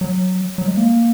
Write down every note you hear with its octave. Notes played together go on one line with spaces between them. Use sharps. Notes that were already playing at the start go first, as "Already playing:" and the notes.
F#3
F#3
G#3
A#3